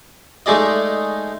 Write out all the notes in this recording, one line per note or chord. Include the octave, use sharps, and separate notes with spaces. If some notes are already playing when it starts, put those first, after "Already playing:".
G#3 A3 D#4 G#4 D5 D#5